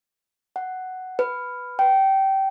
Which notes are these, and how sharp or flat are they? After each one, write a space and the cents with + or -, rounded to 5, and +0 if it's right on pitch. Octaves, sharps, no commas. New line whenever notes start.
F#5 +5
B4 +5
G5 -20